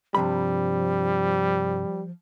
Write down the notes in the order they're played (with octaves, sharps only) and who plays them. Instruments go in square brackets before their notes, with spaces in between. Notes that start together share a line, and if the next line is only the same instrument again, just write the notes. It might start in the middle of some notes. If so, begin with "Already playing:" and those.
[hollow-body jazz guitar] G2 C3 B5 [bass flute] F3 [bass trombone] G3